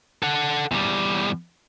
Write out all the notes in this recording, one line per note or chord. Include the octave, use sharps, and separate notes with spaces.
A4 F#5
E2 G3